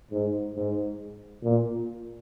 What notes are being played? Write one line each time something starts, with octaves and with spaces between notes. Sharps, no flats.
G#2
G#2
A#2